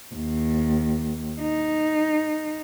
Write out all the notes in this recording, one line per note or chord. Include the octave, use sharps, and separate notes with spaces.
D#2
D#4